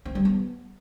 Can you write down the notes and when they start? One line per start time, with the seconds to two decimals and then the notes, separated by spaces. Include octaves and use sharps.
0.05 C4
0.15 G3
0.25 B3